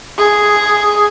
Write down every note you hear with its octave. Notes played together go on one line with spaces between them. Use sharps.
G#4